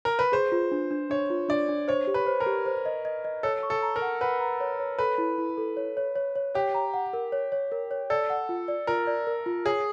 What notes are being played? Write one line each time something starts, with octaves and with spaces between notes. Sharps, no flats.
A#4
B4
G#4 C5
F4
D4
D4
D4 C#5
F4
D4 D5
D4
C5 C#5
G4
B4
C5
A#4
G4
C5
D#5
D#5
D#5
A4 C#5
C#6
A4
A#5
A#4
F#5
B4 F#5
A#5
C#5
C#5
A4 B4
E4
E4
A4
C#5
C#5
C#5
C#5
G4 C#5
A#5
F#5
A#4
C#5
C#5
A#4
C#5
A4 D5
F#5
F4
D5
F4 A#4
D5
A#4
F4
G#4 C#5